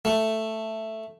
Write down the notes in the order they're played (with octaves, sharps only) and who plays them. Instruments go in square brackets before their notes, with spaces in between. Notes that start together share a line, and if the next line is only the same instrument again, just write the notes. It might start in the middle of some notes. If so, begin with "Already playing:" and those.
[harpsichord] A3